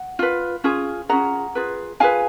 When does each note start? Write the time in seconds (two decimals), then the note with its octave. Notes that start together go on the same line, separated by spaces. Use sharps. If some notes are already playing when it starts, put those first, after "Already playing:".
Already playing: F#5
0.19 F4 B4
0.64 C#4 F4 G#4
1.09 C#4 F4 G#4 F#5 A#5
1.55 F4 G#4 B4
2.00 F4 G#4 B4 F5 G#5